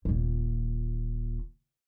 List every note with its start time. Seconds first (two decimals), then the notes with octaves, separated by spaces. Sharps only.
0.05 D#1 A#2